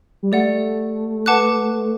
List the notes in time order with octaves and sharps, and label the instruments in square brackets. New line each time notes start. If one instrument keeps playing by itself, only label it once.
[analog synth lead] G3
[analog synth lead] A3 [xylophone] G4 D5 F#5
[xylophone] B4 F#5 A5 D6 F#6